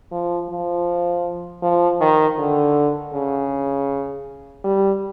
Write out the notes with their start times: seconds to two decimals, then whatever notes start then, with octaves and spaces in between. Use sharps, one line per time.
0.12 F3
0.50 F3
1.63 F3
2.01 D#3
2.39 D3
3.14 C#3
4.65 G3